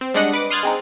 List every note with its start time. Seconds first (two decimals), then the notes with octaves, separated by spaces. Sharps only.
0.01 C4
0.14 G3 G#3 D4 D#5 F#5
0.33 B4 D6
0.50 C6 D#6 F6 F#6 G#6 A6
0.63 G#3 C4 D#4